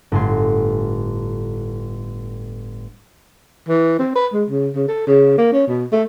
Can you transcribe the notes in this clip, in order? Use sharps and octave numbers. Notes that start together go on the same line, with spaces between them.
G1 A2 G#5 C6
E3
C4
B4
G#3
C#3
C#3
A4
C#3
A#3
C#4
B2
A3